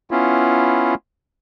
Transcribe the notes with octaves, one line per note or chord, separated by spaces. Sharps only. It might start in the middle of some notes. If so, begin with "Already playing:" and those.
B3 C#4 E4 F4